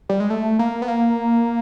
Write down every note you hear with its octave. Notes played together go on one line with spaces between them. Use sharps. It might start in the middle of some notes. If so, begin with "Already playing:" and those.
G3
G#3
A3
A#3
B3
A#3